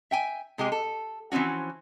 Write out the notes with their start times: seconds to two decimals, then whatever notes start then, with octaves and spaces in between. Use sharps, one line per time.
0.11 E5 G5 G#5
0.58 C3 G#3 G4 G#4
0.72 A4
1.32 E3 F3 C4 C#4 F#4